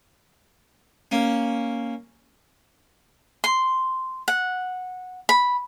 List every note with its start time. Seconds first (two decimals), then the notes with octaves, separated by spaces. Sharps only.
1.11 A#3 C#4
3.44 C6
4.28 F#5
5.29 B5